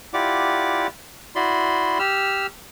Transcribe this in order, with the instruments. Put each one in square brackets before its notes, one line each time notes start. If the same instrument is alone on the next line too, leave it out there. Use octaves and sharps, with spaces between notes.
[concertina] E4 F4 G4 D5 F#5 D6
E4 F#4 D5 B5 C6
G4 E6 F6